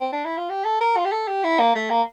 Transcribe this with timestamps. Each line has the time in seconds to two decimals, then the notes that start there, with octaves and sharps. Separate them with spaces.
0.01 C4
0.13 D4
0.25 E4
0.38 F4
0.50 G4
0.65 A4
0.81 A#4
0.97 F4
1.05 G4
1.12 A4
1.28 G4
1.44 E4
1.59 A#3
1.75 A3
1.90 A#3